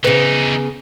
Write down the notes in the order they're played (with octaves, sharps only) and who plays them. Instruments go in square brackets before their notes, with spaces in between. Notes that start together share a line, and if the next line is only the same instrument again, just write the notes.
[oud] C#3 B3 [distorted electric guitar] E3 D#4